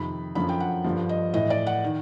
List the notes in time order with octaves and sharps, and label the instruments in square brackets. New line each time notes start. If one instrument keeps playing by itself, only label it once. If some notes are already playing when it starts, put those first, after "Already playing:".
Already playing: [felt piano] F2 C3 D#3 B5
F#2 D3 F3 B5
G5
F#5
G2 D3 F3
D#5
A2 E3 D#5
D5
F#5
D#3